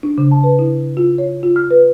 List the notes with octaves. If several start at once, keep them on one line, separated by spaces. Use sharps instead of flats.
D4
C#3
A5
B4
E4
F4
C#5
F4
F6
B4